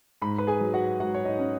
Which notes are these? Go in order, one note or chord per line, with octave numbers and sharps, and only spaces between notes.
G#2 B5
B4 B5
G#4 G#5
F#3
F#4 F#5
G#2 F#4 F#5
C#5
D#4 D#5
C#4